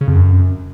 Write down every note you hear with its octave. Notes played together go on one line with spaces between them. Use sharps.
C#3
F2
F#2